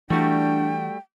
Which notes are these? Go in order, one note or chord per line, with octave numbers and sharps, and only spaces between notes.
E3 G3 A3 D4 F#4 G5